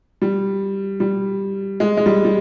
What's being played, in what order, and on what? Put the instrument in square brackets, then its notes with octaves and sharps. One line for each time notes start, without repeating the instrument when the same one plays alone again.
[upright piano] G3
G3
G#3
G#3
G3
G3